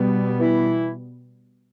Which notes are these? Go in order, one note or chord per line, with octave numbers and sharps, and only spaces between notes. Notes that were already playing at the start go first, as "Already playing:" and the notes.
Already playing: B2 G3 B3
E3 E4